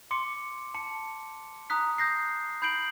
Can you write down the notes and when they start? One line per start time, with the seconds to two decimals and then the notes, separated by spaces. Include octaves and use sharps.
0.11 C6 D6 C#7
0.74 A5 C#7
1.70 A#5 D#6 F#6 B6
1.98 D#6 G6 A#6 C7
2.62 B5 G6 C7 D7 F#7